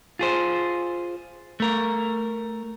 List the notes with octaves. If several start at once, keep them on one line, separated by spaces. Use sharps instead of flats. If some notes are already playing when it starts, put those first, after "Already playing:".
F4 G#4 C5
A3 A#4